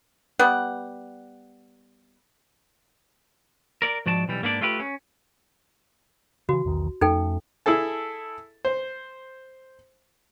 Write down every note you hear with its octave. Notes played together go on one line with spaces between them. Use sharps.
G3 B3 F#5
A#4 D5
G#2 F3 F#4 D5 A5
B1 E3 G3
G#2 A#3 B3 D4 D5
A3 F4 G4 B4
C#4
C#3 E3 F#4
B1 E2 D#3
F2 A3 C#4 D#4 A4 G5
E4 G#4 A4 A5
C5